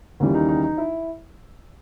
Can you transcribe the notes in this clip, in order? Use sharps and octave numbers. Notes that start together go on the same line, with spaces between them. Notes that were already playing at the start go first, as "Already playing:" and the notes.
D#2 C#3 E3 G3
D#4
D#4
D#4
E4